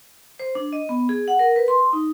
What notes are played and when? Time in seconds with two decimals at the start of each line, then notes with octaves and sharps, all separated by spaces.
0.39 C5
0.55 D4
0.73 D#5
0.89 B3
1.09 G#4
1.28 F#5
1.39 A#4
1.56 B4
1.68 C6
1.93 D#4